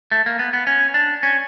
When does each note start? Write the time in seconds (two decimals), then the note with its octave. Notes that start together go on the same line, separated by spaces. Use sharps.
0.12 A3
0.26 A#3
0.39 B3
0.53 B3
0.67 C#4
0.94 D4
1.23 C#4